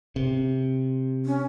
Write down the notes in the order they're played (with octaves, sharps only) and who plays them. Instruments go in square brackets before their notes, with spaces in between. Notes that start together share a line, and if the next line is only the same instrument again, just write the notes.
[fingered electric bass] C3
[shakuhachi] C#4